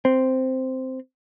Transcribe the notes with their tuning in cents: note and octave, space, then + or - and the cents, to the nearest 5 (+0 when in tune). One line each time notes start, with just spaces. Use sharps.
C4 -5